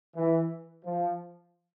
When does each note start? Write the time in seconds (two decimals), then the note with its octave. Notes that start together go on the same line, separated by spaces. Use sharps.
0.16 E3
0.85 F3